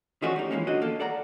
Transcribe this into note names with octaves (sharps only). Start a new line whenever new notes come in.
D#3 F3 A3 C#4 F#4 D5
G3 D#4
E3 F3 G#3 A#3 C#4
B1 D3 D#3 F#4 D#5
A#3 A4
A4 D5 F#5 A#5